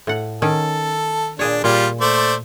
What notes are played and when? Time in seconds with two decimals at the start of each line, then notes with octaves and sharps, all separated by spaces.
0.07 A2 F#5
0.42 D#3 C#4 A4
1.39 A#2 D4 G#4 C#5
1.64 A#2 G3 F4
2.01 A3 C5 D5